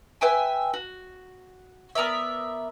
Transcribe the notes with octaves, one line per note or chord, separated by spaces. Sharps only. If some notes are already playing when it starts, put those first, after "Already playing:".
B4 E5 G5 G#5
F#4
B3 A#4 D5 E5